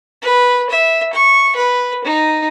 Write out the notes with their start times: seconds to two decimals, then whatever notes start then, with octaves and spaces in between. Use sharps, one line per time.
0.22 B4
0.70 E5
1.14 C#6
1.56 B4
2.05 D#4